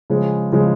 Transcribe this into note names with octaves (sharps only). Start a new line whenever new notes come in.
C#3 F3 G#3
C#3 F3 G#3